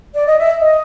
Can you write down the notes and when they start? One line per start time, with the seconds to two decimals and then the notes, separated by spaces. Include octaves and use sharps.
0.15 D5
0.28 D#5
0.39 E5
0.61 D#5